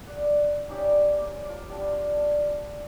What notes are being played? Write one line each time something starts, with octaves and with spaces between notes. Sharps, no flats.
G#4 D5 F#5
C#4 D#4 G4 D5
A#3
F4 A5 D6
G3 B3 D4 F4
A5 C6